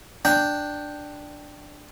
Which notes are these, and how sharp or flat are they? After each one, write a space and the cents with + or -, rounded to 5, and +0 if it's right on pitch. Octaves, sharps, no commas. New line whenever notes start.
D4 +5 G5 +0